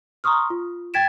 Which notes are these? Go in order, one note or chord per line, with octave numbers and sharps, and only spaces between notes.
A#5 C6 C#6 D#6 F6
F4
G5 G#6 A6 B6 D7 E7